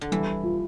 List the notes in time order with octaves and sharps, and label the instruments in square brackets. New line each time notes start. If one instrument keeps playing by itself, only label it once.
[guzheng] D3
[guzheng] E3 [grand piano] G3
[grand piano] F4